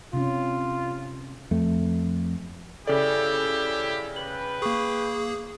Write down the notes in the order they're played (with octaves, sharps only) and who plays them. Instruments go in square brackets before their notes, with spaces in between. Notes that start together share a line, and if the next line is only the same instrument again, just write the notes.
[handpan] C3 C#4 [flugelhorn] F4
[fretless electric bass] F2 A3
[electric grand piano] C#3 D5 [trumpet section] E4 G4 [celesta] A4
[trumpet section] B4 G5 [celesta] F#7
[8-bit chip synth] A#3 G#4 [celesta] C#6